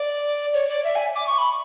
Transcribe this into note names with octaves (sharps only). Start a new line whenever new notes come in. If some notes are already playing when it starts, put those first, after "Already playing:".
Already playing: D5
C#5
D5
E5
G#5
D6
C#6
B5